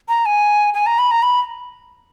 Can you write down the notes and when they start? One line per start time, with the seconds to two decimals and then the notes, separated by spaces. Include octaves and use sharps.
0.09 A#5
0.26 G#5
0.74 G#5
0.86 A#5
0.99 B5
1.11 A#5
1.23 B5